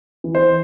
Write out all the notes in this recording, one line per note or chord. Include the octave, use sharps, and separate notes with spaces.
E3
C5